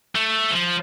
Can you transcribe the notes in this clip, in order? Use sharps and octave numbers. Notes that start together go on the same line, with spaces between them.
A3
F3